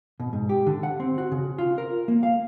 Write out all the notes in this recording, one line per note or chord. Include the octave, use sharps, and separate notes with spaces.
B2
G#2
G4
D3
F#5
C4
F#4
C#3
F4
A#4
A#3
F5